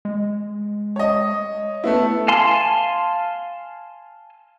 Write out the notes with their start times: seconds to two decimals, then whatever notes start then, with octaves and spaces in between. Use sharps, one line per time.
0.05 G#3
0.96 C#5 D#5
1.84 A3 B3 E4
2.28 F5 G#5 A5 C6